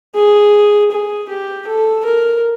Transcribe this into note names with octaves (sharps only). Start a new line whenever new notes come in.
G#4
G#4
G4
A4
A#4